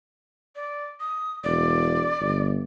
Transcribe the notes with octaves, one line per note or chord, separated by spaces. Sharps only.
D5
D#6
E1 D5
G1